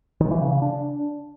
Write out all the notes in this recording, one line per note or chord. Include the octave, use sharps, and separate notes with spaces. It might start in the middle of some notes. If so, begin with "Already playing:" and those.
D#3
E3
C#3
C#3
D4